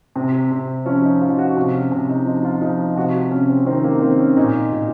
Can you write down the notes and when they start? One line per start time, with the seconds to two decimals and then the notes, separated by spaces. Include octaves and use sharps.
0.15 C3 C4
0.51 C3
0.86 F3 C#4
1.03 D#4
1.22 F3 F4
1.38 F#4
1.57 C3
1.74 C#4
1.92 C3
2.09 D#4
2.26 F3 D#4
2.44 F4
2.61 F3 D#4
2.96 C3 F#4
3.31 C3 C#4
3.49 C4
3.66 D#3 C4
3.84 A#3
4.02 D#3 C4
4.19 C#4
4.37 A#2 D#4
4.73 A#2